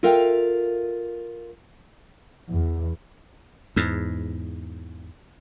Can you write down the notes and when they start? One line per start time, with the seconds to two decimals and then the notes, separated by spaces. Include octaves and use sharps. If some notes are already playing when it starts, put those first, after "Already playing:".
0.03 F4 A4 A#4 E5 F5 G5
2.51 E2
3.76 E2 G#2